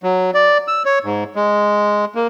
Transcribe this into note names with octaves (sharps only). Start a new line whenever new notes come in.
F#3
D5
E6
C#5
G#2
G#3
A#3